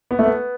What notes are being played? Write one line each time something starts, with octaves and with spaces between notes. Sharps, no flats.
B3
A3
B3